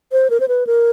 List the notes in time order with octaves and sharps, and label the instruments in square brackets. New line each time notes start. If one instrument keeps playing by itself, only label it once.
[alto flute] C5
A#4
C5
B4
A#4